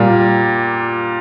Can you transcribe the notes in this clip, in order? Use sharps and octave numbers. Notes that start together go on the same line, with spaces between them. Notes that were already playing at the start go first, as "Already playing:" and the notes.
Already playing: A#2 G3